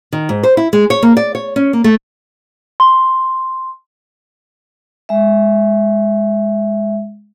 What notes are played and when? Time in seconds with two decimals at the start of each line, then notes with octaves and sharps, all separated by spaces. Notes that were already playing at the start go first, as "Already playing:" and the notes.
0.13 D#3
0.29 G#2
0.43 C5
0.57 E4
0.73 G#3
0.90 C#5
1.03 A#3
1.17 D5
1.35 C#5
1.56 C#4
1.73 A#3
1.84 A3
2.80 C6
5.09 G#3 E5